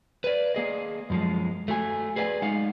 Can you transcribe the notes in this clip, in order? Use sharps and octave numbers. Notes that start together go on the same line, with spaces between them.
B4 D5
A#3 G#4 D#5
F#2 F3 G#3
A3 F#4 G#5
G#4 B4 D5 F5 G#5
G#3 D#4 F5 F#5